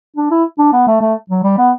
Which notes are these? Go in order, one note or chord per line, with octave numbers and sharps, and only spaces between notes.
D4
E4
D4
B3
A3
A3
F#3
G3
B3